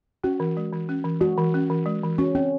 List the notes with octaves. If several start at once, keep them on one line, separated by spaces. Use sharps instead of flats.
C#4 F#4
E3
G#3
E3
C#4
E3
G#3 F#4
E3
C#4
E3
G#3
E3
C#4 F#4
C4 C#4